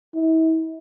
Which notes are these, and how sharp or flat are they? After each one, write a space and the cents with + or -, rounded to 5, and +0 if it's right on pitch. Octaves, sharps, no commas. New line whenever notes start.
E4 -40